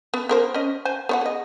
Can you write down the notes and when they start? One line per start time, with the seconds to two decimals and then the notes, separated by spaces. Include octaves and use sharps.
0.14 B3
0.29 B3 A#4 C5
0.54 C#4 D#5
0.85 C5 G#5
1.09 B3 C#5 F#5
1.21 G#4 D#5